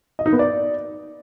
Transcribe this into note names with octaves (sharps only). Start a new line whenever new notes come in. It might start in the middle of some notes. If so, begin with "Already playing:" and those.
D#5
D#4
B3
D5